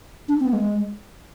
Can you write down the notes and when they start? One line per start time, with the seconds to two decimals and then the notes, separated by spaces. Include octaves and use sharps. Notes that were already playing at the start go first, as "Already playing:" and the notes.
0.28 D4
0.40 C4
0.45 B3
0.53 G#3